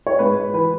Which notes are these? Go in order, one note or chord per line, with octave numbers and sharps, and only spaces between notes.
C#5
G#2 B4
E3 B4